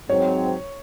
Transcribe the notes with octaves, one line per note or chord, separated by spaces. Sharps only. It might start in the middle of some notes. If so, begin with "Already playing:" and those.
G#2 F#3 C4 C#5